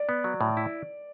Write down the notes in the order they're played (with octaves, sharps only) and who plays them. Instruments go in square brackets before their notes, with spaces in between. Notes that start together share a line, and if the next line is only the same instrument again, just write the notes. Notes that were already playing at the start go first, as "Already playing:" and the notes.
Already playing: [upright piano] D5
[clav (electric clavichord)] B3
F#3
A2
E4